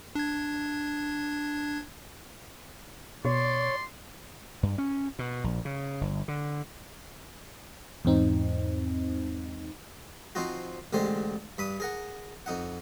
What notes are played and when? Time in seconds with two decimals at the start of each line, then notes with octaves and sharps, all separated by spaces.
0.15 D4 G#6
3.25 B2 C#5 D5 C6
4.63 G2
4.78 C#4
5.19 B2
5.44 A#1
5.65 C#3
6.01 G1
6.28 D3
8.05 E2 G#2 C4 D#4
10.35 F3 C4 D#4 F4 F#4
10.93 A1 D3 G#3 G4 C5
11.58 G2 B5 D#6
11.80 G#4 A#4 F#5
12.46 F2 D#4 F#5